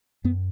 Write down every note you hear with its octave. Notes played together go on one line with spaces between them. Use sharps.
F#2 B3